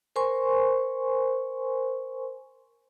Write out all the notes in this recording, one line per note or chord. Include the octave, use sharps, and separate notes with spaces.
A#4 C5 G#5 C6 C#6